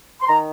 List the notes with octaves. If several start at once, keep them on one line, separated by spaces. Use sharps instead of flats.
C6
D#3 A#5